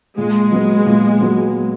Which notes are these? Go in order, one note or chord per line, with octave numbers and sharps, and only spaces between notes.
A#2 G#3
F#3 B3
A#2
F#3 B3